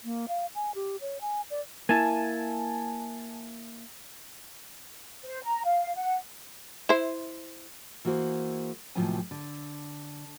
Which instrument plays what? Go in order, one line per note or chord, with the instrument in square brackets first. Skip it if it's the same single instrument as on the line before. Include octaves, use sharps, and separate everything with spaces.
[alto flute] A#3
F5
G#5
G4
C#5
G#5
D5
[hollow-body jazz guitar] A#3 E4 [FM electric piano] G#5 A5
[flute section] C5
A#5
F5
F#5
[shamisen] E4 C5
[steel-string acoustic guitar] E3 A#3 F#4 G#4 C5
D#2 A2 C3 F3 F#3 G#5
D3